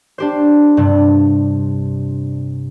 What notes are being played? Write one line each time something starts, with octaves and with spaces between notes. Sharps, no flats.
D4 G4 C5
G2 C3